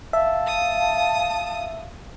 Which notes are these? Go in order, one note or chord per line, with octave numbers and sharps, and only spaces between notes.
E5 F5 A5
D#6